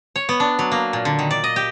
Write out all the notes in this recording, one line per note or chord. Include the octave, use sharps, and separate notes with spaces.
C#5
B3
D4
F#3
A#3
A#2
D3
D#3
D5
D#5
G4